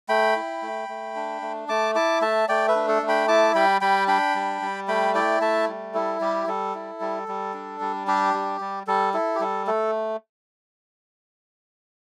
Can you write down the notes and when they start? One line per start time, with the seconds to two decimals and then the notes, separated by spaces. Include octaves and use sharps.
0.09 A3 G5 B5
0.36 E4
0.62 A3
0.89 A3
1.15 D4
1.42 A3
1.69 A3 A5 D6
1.95 E4 A5 D6
2.21 A3 E5 A5
2.48 A3 D5 G5
2.68 B4 E5
2.75 D4
2.88 A4
3.02 A3
3.08 G5 B5
3.28 E4 A5 D6
3.55 G3 G5 B5
3.81 G3 G5 B5
4.08 D4 G5 B5
4.35 G3
4.62 G3
4.88 A3 G5 B5
5.15 E4 D5 G5
5.41 A3 E5 A5
5.68 G3
5.94 E4 A4
6.21 G3 G4
6.47 G3 A4
6.75 E4
7.01 G3
7.28 G3
7.54 D4
7.81 G3
8.07 D4 G4
8.34 G3
8.61 G3
8.87 G3 A4
9.14 E4 A4
9.35 G4
9.40 G3 A4
9.67 A3 A4